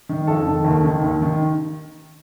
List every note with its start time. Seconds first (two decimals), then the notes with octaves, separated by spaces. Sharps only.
0.09 D#3
0.27 F2 A4
0.47 D#3
0.65 D#2
0.84 D#3
1.02 D#2
1.22 D#3